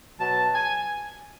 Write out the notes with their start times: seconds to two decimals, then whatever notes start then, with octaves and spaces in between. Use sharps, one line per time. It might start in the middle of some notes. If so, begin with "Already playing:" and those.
0.19 B2 F#3 A5
0.54 G#5